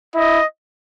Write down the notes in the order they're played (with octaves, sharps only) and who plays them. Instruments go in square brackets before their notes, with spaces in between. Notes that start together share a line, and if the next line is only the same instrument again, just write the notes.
[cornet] E4 [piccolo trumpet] D#5